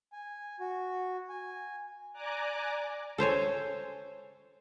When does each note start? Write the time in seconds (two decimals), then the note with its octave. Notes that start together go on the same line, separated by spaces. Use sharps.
0.13 G#5
0.60 F#4
1.30 G#5
2.13 D5 G#5 A#5 D6 F#6
3.18 A4 C5 C#5 G#5